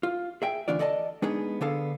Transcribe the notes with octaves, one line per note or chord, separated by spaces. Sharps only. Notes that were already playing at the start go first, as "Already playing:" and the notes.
F4
G#4 E5 G5
D2 E3 D4 F4 D5
A4 D5 D#5 F5 A5
G#3 B3 D4 D#4 G#4
D3 B3 D4 G#4 A4 F5